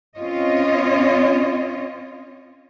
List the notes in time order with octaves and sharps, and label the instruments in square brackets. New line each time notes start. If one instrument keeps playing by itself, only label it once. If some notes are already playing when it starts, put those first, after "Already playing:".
[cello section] C4 C#4 F4 C#5 D#5